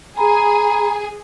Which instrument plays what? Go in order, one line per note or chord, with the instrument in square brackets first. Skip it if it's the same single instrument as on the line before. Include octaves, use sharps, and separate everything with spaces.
[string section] G#4 [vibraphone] A#5 B5